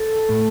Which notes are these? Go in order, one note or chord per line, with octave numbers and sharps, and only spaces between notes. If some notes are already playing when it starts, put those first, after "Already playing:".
Already playing: A4
A2 A3